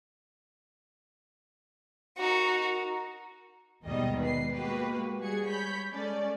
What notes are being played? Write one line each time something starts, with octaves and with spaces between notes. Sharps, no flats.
D#4 F#4 A#4
D#2 G#2 B2 D#3 G3 D#5
B4 C7
G#3 A#3 F#4 G4 B4
G3 F#4 G#4 G#6 C#7
C#5 B5 G6 B6
G#3 C#4 A4 D5